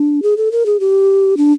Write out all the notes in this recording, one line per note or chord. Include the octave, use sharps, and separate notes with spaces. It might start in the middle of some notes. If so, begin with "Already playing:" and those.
Already playing: D4
G#4
A4
A#4
G#4
G4
D4